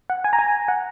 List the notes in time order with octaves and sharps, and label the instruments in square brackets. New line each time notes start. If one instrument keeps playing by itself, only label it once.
[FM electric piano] F#5
G#5
A#5
G#5
F#5